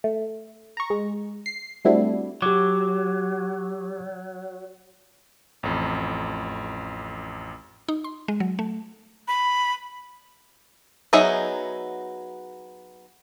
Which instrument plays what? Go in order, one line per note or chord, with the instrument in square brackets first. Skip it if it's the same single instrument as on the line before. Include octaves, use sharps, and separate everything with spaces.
[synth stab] A3
A#5 C#6
G#3
C7
G3 A3 C4 D4 E4 F#4
[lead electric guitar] F#3 [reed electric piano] G4 D6
[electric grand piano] A1 F2
[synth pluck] D#4
C6
G#3
F#3
A3
[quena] B5
[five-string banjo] F#3 B3 D#4 G#4 E5